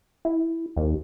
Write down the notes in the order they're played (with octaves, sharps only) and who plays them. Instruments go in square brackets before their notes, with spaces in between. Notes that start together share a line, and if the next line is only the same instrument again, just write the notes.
[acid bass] E4
D#2